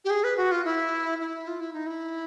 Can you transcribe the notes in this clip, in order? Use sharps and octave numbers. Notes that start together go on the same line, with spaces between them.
G4
G#4
B4
F#4
F4
E4
E4
F4
E4
D#4
E4